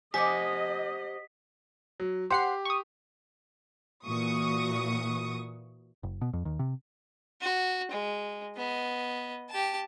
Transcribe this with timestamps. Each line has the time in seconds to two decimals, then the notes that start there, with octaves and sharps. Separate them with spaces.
0.14 G4 C5 D#5 F#5 G#5 D6 B6
2.00 F#3
2.30 G4 C5 F#5 C7
2.65 C#6 D#6
4.06 A#2 E3 F#4 C#6 D#6
6.03 F#1
6.21 B2
6.33 F2
6.45 D#2
6.59 C3
7.41 F#4
7.91 G#3
8.57 B3 D#5
9.50 G4 A5